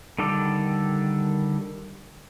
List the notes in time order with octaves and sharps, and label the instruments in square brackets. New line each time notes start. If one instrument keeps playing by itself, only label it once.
[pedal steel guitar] D3 D#3 G3 A4 D6